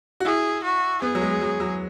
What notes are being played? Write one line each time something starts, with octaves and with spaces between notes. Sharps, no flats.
F#4
E4 G#4
F#4
B3 G#4
F#3
G#3
F#3
F#3